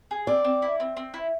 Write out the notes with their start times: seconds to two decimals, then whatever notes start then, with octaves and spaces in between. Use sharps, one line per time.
0.11 G#4
0.27 C4 D5
0.44 C4
0.62 E4
0.80 C4
0.97 C4
1.14 E4